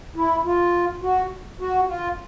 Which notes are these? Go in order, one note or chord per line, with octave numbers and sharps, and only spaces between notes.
E4
F4
F#4
F#4
F4